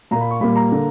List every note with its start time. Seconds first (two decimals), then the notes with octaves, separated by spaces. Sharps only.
0.11 A#2 A#3 A#5
0.21 B5
0.31 C#6
0.41 A#2 G3 A#3 B5
0.56 A#5
0.72 D3 A#3